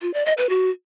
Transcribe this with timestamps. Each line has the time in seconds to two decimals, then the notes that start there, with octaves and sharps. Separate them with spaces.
0.02 F4
0.14 D5
0.26 D#5
0.38 B4
0.49 F#4